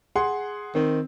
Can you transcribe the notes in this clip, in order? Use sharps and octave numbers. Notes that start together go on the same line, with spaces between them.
G#4 F#5 C6
D#3 C4